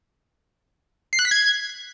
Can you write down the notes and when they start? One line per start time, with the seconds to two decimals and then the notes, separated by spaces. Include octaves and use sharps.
1.13 C7
1.19 F#6
1.25 B6
1.31 G#6